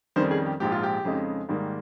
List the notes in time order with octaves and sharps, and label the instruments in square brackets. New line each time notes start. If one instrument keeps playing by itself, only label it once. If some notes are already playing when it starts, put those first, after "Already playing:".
[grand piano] F2 D#3 G3 C#4 C5
G#4
G4
A#1 G#2 F3 G4
F4
G4
F2 C#3 G#3 D#4
G#2 D#3 G3 A#3